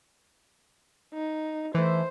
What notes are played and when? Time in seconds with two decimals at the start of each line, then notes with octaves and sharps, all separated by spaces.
1.13 D#4
1.75 E3 A3 C5